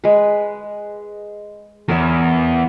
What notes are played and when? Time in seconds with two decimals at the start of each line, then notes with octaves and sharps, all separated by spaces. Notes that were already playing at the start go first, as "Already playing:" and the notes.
0.04 G#3 B4
1.88 E2 A#4 C#5 E5